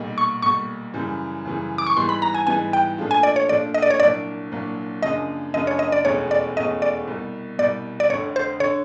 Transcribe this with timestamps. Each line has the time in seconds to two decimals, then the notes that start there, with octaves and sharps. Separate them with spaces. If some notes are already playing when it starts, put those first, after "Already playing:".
Already playing: B1 A#2 G3
0.18 C#6
0.42 B1 A#2 G3 C#6
0.94 F#2 C#3 E3 G3
1.45 F#2 C#3 E3 G3
1.78 D6
1.87 C#6
1.96 G#2 E3 G3 B3 C6
2.09 B5
2.22 A#5
2.34 G#5
2.47 G#2 E3 G3 B3 G#5
2.73 G5
2.98 A#2 F3 A3 D4 F4
3.11 G#5
3.23 D5
3.36 C#5
3.49 A#2 F3 A3 D4 F4 D5
3.74 D#5
3.82 D5
3.90 C#5
4.00 C2 A#2 F#3 A#3 D4 D5
4.52 C2 A#2 F#3 A#3 D4
5.03 F#2 C#3 F3 A#3 D4 D#5
5.54 F#2 C#3 F3 A#3 D4 D#5
5.67 C#5
5.79 D#5
5.92 D5
6.05 F1 E2 B2 G#3 C#4 C#5
6.31 D5
6.56 F1 E2 B2 G#3 C#4 D#5
6.82 D5
7.07 C2 B2 G3
7.59 C2 B2 G3 D5
8.00 D5
8.10 F1 F2 D3 C#5
8.36 C5
8.60 D3 C#5